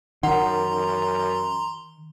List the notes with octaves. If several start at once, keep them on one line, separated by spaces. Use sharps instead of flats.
F#2 D#3 F#5 A#5 C6